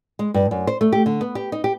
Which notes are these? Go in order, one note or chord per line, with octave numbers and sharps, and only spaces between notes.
G#3
G2
F#2
C5
A3
G4
D3
B3
G4
D#4
G4